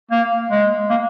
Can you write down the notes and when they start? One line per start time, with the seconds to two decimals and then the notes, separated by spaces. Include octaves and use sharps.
0.11 A#3
0.51 G#3
0.90 A#3